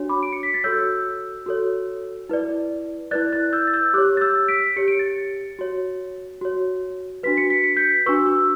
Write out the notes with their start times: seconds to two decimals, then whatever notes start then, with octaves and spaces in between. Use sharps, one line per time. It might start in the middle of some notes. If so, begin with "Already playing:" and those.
Already playing: D4 F#4 C#5
0.09 B5 D6
0.23 D7
0.33 C#7
0.43 B6
0.54 A6
0.64 F#4 A4 C#5 E6 G6
1.46 F#4 A4 C#5
2.29 E4 B4 D5
3.11 E4 B4 D5 F#6 A6
3.33 F#6 A6
3.53 E6 G6
3.67 A6
3.73 E6 G6
3.94 G4 C#5 D6 F#6
4.17 A6
4.21 E6 G6
4.48 B6 D7
4.76 G4 C#5 C#7
4.88 D7
4.99 A6 C#7
5.59 F#4 C#5
6.41 F#4 C#5
7.23 D4 F#4 B4 B6
7.37 C#7
7.50 B6
7.64 C#7
7.77 G6 B6
8.06 D4 F#4 B4 C#6 E6
8.27 C#6 E6